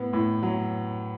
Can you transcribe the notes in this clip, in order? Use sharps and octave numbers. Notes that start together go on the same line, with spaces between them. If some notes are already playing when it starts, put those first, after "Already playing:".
Already playing: A2 B3
A2
F#3